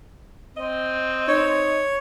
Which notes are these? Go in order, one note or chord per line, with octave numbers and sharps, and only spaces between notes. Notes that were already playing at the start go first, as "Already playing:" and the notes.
C4 D#5
D#4 C#5